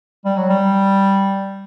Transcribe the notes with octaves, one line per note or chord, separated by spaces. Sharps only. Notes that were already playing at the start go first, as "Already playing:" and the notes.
G3
F#3
G3